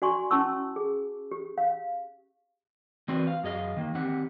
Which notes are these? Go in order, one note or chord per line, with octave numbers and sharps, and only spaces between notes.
F#4 D5 G#5 C6 C#6
C#4 E4 A5 C#6 E6
G#4
G4
F5
E3 C4 F#4 B4 C5 D5
F5
F#2 G#4 D#5 F5
D#3 A#3
D#3 C4 G4 F#5